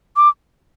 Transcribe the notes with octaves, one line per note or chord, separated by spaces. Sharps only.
D6